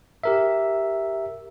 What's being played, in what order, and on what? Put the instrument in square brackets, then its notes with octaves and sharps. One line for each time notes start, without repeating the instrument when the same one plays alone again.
[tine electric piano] G4 A#4 E5